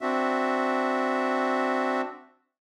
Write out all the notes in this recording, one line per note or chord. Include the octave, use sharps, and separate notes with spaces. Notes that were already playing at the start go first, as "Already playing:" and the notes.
C4 D4 F#4 E5